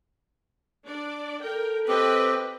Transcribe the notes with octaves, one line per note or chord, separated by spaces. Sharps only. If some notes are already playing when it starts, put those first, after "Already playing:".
D4 D5
A4 A#4 G5
C4 G4 B4 D#5 G5